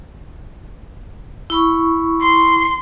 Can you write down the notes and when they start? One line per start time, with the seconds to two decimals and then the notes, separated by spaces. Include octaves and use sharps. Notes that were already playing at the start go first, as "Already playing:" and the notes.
1.50 E4 B5 C#6
2.21 C6